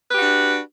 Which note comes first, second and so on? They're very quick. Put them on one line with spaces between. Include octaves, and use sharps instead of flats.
B4 G4 F#4 D4